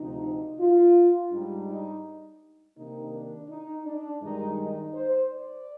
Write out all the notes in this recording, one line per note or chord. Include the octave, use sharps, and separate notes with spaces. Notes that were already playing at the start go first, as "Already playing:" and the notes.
Already playing: D2 C3 F3 D#4
F4
G#2 G3 D4 D#4
D#4
C3 D#3 A#3 D4 D#4
D4
D#4
D4
G2 D#3 G#3 D#4
D#4
C5
D5